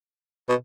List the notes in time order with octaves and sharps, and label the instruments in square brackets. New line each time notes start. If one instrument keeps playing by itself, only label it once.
[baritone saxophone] B2